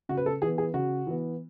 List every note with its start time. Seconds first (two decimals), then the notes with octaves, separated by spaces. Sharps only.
0.09 C#3 F#4
0.17 B4
0.26 A4
0.42 E3 B3 G#4
0.58 G#4
0.74 C#3 F#4
1.07 E3 B3